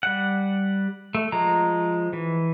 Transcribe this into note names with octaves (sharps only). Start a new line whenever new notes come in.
G3 F#5
A3
F3 G#3 A#5
E3